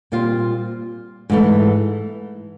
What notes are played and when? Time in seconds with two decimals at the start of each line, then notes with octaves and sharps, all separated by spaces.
0.12 A#2 G3 C4 F4
1.30 G#2 E3 A3